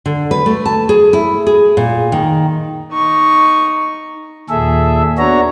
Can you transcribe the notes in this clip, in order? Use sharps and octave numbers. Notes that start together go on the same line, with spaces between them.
D3
B4
A3
A5
G#4
E4
G#4
A#2
D#3
D#4 C#6
D#2 A#2 G#4 A4 E5
B3 D4 F#4 C#5 A#5